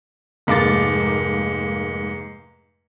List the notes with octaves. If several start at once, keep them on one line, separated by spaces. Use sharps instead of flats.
F1 G#2 A#3 D6 A6